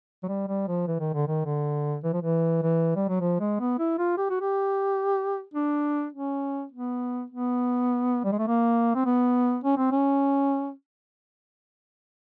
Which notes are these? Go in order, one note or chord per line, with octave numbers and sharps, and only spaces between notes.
F#3
G3
G3
F3
E3
D#3
D3
D#3
D3
E3
F3
E3
E3
G3
F#3
F3
G#3
B3
E4
F4
G4
F#4
G4
D4
C#4
B3
B3
G3
G#3
A3
A#3
C4
B3
C#4
C4
C#4